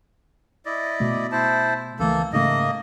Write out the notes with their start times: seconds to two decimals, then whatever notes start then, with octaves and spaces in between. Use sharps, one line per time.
0.65 E4 D5 D#5
1.00 B2 A3
1.32 E4 C5 A5
1.99 C#2 E3 A3 A#3 A4
2.33 G#2 C#3 A3 A#3 D#5